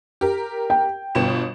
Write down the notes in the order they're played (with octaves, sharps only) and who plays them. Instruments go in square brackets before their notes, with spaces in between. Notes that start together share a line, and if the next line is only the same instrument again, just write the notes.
[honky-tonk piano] G4 A#4
[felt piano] G5
[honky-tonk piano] G1 B2 E7